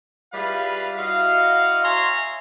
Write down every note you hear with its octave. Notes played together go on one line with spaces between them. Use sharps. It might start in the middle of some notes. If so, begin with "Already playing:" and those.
G3 E4 F4 G#4 B4 F5
E4 F#4 D#5 F5
C#5 E5 G#5 A#5 C6